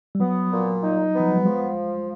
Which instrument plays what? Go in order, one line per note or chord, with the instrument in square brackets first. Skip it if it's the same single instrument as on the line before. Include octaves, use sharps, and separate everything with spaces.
[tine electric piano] G3
[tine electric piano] F#3 [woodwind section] B3
[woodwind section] A#2
D#4
B3
[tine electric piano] F3
F#3
G3
[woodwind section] F3 [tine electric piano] G#3